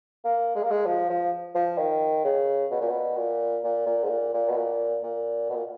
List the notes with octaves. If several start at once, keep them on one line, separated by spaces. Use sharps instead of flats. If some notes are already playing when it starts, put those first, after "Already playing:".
A#3
G#3
A#3
G#3
F3
F3
F3
D#3
C#3
B2
A#2
B2
A#2
A#2
A#2
G#2
A#2
A#2
B2
A#2
A#2
B2
A#2